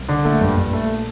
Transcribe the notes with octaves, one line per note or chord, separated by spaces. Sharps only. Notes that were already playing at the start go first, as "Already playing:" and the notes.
Already playing: C2 C3
D3
A#1 A#2 A3
G2
G2
A3